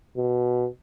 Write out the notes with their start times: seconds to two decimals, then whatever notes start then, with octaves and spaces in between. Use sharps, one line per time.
0.17 B2